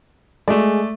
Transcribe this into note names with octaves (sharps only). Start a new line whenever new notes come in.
G#3 A3 D5